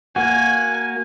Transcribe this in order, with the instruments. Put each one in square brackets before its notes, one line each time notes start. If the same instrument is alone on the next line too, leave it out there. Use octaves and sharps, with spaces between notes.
[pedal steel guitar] A#3 F#4 [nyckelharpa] G#5